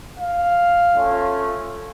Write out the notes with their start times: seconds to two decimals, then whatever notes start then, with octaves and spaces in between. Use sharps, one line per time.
0.19 F5
0.94 A3 C#4 F4